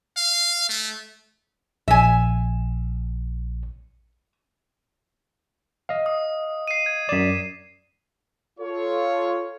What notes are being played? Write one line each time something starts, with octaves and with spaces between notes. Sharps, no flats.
F5
A3
A#1 E5 G#5
D#5 F5
D#6
C7 D#7
G#6
F#2 D5 B6 E7
F4 A4 C#5